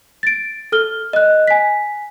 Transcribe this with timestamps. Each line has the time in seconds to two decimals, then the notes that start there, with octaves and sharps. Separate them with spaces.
0.23 A6 D7
0.72 A4 F6 G7
1.13 D#5 F#6
1.48 G#5 B6